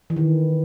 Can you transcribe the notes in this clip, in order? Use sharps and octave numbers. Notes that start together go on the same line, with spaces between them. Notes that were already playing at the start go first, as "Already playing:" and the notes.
E3
D#3